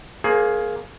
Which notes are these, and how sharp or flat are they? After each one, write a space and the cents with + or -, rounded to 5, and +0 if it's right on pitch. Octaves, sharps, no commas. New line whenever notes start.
A#3 +0 G#4 +20 C5 +35